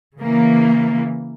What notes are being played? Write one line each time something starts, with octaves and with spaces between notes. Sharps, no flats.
C#3 E3 A#3